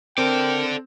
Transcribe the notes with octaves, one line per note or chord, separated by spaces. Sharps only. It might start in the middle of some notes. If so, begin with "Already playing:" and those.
C4 A4 A#4 D5 G5